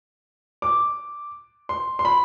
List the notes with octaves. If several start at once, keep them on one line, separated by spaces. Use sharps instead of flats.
D6
C6
C6
B5